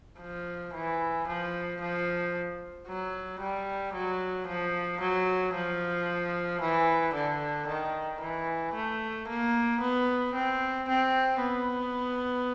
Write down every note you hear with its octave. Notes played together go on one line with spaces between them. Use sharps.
F3
E3
F3
F3
F#3
G3
F#3
F3
F#3
F3
E3
D3
D#3
E3
A3
A#3
B3
C4
C4
B3